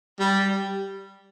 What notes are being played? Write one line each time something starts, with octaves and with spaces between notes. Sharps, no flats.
G3